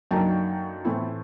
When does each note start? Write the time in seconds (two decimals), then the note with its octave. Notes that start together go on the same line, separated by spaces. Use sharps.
0.11 F#2 D3 F#3 A#3 D#4 G5 A5
0.85 A2 E3 A3 C4 E4